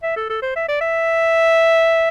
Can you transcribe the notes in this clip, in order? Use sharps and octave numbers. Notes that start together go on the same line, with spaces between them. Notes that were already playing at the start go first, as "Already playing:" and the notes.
E5
A4
A4
C5
E5
D5
E5